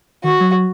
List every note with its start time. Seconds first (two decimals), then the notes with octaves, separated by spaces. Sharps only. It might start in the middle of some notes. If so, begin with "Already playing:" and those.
0.24 D#3 F#4
0.40 F#3